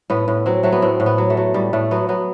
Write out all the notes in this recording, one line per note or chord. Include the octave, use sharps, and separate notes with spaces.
A2 B3
A2
F#3 C4
F#3 A3
B3
A2 C4
A2
B3
F#3
A3
F#3
A2 G3
A2 A3
F#3 B3
F#3 B3